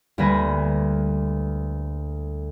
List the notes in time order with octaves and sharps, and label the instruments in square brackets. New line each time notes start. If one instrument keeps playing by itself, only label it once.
[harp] D2 G3 A#3 B4 G#5 A#6